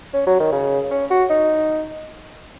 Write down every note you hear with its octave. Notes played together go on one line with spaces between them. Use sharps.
C#4
F#3
D#3
C#3
C#4
F#4
D#4